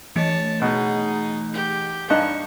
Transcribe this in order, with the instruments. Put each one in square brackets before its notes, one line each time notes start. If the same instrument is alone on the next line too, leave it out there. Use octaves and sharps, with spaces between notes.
[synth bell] E3 A3 D#5 [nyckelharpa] C#5 A5
[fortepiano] B2 [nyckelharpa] D#4 G#4
[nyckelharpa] G4
[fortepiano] G2 D#4 F#6 [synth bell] F5 [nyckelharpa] C#6